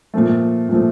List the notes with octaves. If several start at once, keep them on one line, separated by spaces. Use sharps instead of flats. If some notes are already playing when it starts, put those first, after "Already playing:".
A#2 F3 A3
A#2 F3 A3